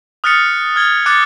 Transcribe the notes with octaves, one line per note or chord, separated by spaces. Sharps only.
D#6 F6 F#6 A6 B6 C#7
F6 G#6 G7
D6 F#6 A6 C#7